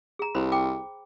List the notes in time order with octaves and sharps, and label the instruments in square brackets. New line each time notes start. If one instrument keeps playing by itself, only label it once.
[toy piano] G#4 A#5
[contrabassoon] C2 [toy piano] C5 B5
[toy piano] G5 D6